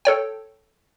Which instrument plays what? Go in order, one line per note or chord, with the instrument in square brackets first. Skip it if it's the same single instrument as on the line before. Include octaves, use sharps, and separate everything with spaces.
[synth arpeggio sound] A4 C#5 G5